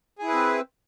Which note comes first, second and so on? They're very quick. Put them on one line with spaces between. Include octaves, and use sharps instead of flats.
G#4 E4 B4 C4